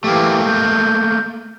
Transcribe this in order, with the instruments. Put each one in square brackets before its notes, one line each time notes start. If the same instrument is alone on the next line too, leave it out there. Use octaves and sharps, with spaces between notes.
[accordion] E3 G4 [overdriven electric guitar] A3 A#3
[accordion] G6